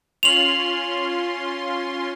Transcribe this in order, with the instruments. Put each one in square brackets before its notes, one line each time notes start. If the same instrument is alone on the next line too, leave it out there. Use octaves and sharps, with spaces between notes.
[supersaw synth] C#4 F4 C6 [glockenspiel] F7 F#7